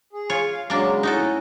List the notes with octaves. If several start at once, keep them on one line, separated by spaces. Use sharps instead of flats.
G#4
F4 C#5
F5
C#3 F#3 G#3 A#3 D4
A2 C#4 D#4 F#4 A4